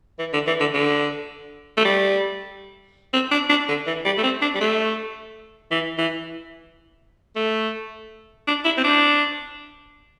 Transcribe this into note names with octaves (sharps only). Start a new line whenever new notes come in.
E3
D3
E3
D3
D3
A3
G3
C4
D4
D4
D3
E3
G3
A3
C4
D4
G3
A3
E3
E3
A3
D4
E4
C4
D4